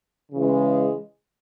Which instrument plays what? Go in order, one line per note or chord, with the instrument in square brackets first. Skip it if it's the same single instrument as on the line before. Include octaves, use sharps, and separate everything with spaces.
[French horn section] C#3 E3 G#3